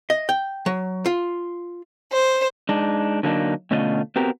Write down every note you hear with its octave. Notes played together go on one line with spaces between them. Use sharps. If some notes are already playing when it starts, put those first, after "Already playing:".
D#5
G5
F#3
F4
C5
G#3 D4 D#4
D3 F#3 A#3 D4 D#4
B2 D3 A3 C#4 F4 D#5
B3 C4 F#4 G4 A#4